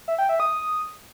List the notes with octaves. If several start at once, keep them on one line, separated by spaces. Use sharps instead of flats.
E5
G5
E5
D#6